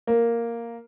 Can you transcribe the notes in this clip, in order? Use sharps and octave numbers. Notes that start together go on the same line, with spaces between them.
A#3